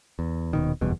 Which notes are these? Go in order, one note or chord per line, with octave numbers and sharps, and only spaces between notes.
E2
D#1 B2 D#3
F#1 E2 G2 B2